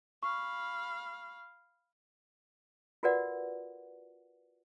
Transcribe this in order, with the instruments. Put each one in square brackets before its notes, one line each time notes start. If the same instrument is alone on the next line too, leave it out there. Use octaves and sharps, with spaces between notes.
[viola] F5 B5 [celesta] C#6
[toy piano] F4 F#4 A#4 B4 D5 F#5